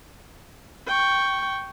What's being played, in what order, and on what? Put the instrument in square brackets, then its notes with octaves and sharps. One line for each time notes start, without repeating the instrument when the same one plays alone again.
[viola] G5 C#6